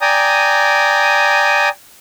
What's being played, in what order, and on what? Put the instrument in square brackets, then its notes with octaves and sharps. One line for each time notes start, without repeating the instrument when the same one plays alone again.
[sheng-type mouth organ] D5 G5 G#5 A#5 D#6